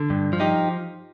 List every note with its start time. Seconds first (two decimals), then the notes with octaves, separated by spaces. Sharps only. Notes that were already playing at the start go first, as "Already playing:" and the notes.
Already playing: D3
0.10 G2
0.33 F3
0.40 D#4 G4